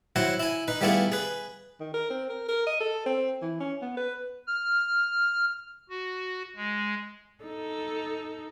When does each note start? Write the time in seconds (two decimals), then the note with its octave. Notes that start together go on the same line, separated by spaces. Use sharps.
0.16 F#3 E4 C5 F#5
0.40 E4 G#5
0.68 D#4 B4
0.81 G3 A3 B3 E4 F4 G#4
1.12 G#4 B4
1.80 D#3
1.94 A#4
2.10 C4
2.30 A#4
2.48 A#4
2.67 D#5
2.80 A4
3.06 C4
3.42 E3
3.60 C#4
3.82 B3
3.97 B4
4.47 F6
5.89 F#4
6.56 G#3
7.44 D#4 A4